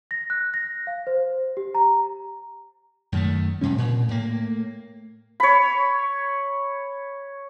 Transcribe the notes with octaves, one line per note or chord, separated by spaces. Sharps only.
A#6
F#6
A#6
F5
C5
G4
A#5
F#2 D#3 A3
G#2 C3 G3 C#4
A#2
A2 A#3
C#5 B5